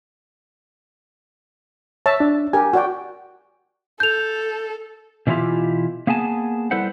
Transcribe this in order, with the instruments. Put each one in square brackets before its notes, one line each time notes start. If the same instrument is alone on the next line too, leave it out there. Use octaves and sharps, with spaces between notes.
[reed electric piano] C#5 [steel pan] E5 A5
[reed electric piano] D4
[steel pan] G4 A#4 [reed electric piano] G#5
[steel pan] F#4 D5 G5
[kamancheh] A4 [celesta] G6 F7
[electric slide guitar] B2 E3 C#4 E4 F4 G4
A#3 B3 G#4 G#5 A5
G3 E4 A4 B4 C5 F#5